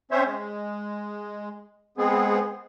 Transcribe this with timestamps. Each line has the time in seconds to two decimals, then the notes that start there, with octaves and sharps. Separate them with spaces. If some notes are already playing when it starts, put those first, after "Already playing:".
0.11 C4 C#4 C5 C#5 E5
0.25 G#3
1.98 G#3 B3 C4 G#4